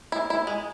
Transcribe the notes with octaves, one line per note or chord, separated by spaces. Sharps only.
E4
E4
G#3